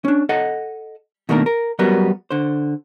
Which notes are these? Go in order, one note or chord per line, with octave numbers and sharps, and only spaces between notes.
C#4 D4
A4 D#5 F#5
B2 D#3 A3 A#3 D4 A#4
A#4
F#2 F#3 G3 B3 A#4
D3 C5